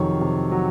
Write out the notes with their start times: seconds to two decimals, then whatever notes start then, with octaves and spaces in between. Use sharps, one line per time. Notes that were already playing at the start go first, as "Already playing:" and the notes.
Already playing: F2 C3 D#3 F#3 C#5
0.21 C3
0.51 F#3